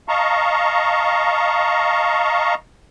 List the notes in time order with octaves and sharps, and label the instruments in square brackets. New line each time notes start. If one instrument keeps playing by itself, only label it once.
[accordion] D#5 F5 A5 A#5 C#6